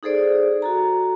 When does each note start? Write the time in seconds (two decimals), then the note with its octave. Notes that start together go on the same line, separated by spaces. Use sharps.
0.03 D#4 G#4 A4 C5 D5
0.62 F#4 A4 A#5